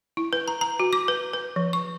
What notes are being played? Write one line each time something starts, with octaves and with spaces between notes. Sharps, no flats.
E4
B4
A#5
A#5
F#4
D6
B4
B4
F3
C#6